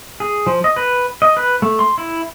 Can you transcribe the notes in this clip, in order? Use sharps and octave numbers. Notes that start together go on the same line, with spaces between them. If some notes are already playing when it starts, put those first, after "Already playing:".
G#4
F3
D#5
B4
D#5
B4
A3
C6
E4